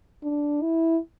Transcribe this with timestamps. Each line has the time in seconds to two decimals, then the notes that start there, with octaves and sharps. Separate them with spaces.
0.23 D4
0.62 E4